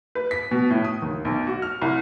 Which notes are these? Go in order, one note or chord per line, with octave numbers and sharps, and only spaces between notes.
B4
B6
B2
A2
D#6
D#2
B1
F#4
F6
C2